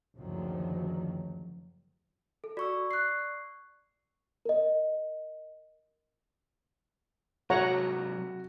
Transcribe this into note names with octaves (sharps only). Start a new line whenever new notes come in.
F#1 D2 D#3 F3 F#3
A4
F#4 D5 C#6 E6
F#6 C7
A#4 D#5
C3 F#3 F#4 C#5 F#5 A#5